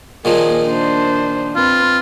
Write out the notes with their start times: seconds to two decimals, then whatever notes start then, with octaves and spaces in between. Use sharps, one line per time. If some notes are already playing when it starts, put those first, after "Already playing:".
0.25 A#2 D#3 F3 A#3 G#4
0.66 D4 C5
1.56 C4 F4 B4